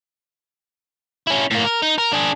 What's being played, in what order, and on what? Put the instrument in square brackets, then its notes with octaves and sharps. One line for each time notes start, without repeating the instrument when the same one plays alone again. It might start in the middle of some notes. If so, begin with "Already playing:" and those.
[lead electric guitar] C#4 E4
A2 A#3
A#4
D#4
A#4
D4 G#4